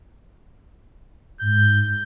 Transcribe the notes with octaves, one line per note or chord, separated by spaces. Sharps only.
G#2 G6